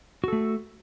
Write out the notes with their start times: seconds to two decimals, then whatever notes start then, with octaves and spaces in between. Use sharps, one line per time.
0.24 F#4
0.28 A4
0.33 A3